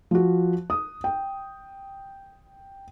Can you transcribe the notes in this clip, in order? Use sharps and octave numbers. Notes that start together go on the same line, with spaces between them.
F3 F#4
D#6
G5